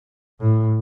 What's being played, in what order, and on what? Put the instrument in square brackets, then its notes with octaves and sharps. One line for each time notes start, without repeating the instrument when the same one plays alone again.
[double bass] A2